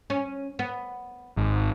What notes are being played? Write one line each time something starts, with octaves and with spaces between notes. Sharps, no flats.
C#4
B3
G#1